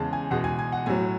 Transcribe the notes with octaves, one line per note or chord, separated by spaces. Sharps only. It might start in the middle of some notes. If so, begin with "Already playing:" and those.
Already playing: E2 C#3 G#3 A5
G#5
E2 B2 G#3 F#5
G#5
G#5
F#5
A2 F#3 G#5